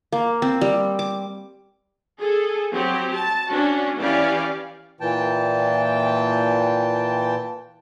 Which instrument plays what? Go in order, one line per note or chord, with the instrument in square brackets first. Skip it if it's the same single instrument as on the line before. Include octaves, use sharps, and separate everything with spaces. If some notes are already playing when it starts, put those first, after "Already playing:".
[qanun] A#3
C4
G3
D6
[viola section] G#4 A4
F#3 C4 G4
A5
C#4 D4 F#4
E3 C#4 G4 D5 F5
[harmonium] A#2 E3 G5 A5